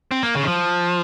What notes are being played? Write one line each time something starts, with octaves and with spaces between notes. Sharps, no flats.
C4
A#3
C#3
D#3
F3